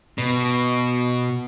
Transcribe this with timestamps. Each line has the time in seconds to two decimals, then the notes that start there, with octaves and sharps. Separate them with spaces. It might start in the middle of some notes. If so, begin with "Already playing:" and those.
0.18 B2